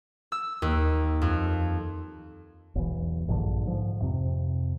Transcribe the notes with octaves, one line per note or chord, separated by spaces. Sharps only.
E6
D#2
F2
E1 B1 E3
A#1 G2 D3
G#2 F3
F2 C3